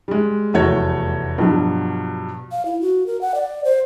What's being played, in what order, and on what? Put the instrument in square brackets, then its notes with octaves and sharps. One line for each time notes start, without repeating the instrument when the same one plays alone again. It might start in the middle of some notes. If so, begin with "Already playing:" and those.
[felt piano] G3 G#3
F1 E2 A3 F#4 C#5 G#6
G2 B2 F3 F#3
[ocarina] F5
E4
F#4
A#4
F#5
D5
C5